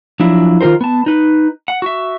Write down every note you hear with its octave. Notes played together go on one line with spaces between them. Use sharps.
F3 F#3 D4 E4
D#3 F4 G4 A#4 C5
B3 A5
D#4 B4
F#5
F#4 E5